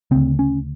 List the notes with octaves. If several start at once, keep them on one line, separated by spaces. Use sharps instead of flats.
D2 C#3 C4
C#4